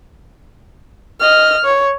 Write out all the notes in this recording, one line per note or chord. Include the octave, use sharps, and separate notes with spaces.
D#5 F6
C#5